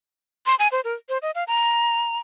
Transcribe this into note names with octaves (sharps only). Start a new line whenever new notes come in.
C6
G#5
C5
A#4
C5
D#5
F5
A#5